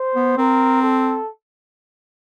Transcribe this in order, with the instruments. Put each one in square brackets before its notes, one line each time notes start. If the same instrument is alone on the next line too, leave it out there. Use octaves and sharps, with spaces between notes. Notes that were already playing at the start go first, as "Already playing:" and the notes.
Already playing: [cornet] C5
[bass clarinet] B3
[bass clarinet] C4 [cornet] A#4
[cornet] A4